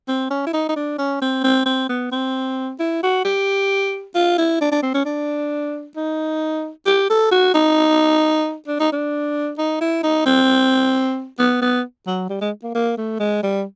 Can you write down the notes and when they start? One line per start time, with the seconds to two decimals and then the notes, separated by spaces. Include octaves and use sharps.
0.08 C4
0.30 C#4
0.47 E4
0.53 D#4
0.69 D#4
0.76 D4
0.98 C#4
1.22 C4
1.44 C4
1.66 C4
1.89 B3
2.12 C4
2.80 E4
3.03 F#4
3.25 G4
4.15 F4
4.38 E4
4.61 D4
4.72 D4
4.83 C4
4.94 C#4
5.05 D4
5.96 D#4
6.86 G4
7.10 A4
7.31 F#4
7.54 D#4
8.67 D4
8.80 D#4
8.92 D4
9.58 D#4
9.81 E4
10.03 D#4
10.26 C4
11.39 B3
11.62 B3
12.07 F#3
12.29 G3
12.41 G#3
12.63 A#3
12.75 A#3
12.98 A3
13.20 G#3
13.43 G3